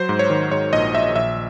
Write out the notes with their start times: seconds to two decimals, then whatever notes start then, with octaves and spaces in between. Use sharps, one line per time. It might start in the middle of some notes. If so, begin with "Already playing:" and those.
Already playing: F#3 C5
0.09 G#2
0.19 C#5
0.30 D#3
0.51 G#2 C#5
0.73 A#1 D#5
0.95 A#1 E5
1.15 A#1 E5